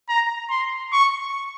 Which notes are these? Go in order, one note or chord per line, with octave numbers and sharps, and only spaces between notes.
A#5
C6
C#6